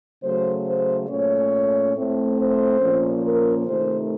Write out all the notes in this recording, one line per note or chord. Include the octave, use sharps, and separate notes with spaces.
C#3 F#3 A3 C5
C5
A#2 A3 C#4 C#5
A2 A3 C4
C5
A#2 F3 A#3 C#4
A#4
C3 D#3 A3 C5